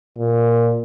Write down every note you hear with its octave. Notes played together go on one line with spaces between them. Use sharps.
A#2